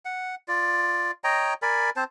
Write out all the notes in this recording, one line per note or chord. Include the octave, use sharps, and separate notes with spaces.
F#5
F4 D5
C#5 D#5 G5 A#5
A#4 D5 G#5 B5
C4 C5 A5